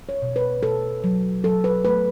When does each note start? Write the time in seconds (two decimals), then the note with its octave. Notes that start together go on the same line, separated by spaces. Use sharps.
0.09 C#5
0.22 B2
0.36 B4
0.63 B2 A4
1.04 F#3
1.44 F#3 A4
1.64 B4
1.85 A3 B4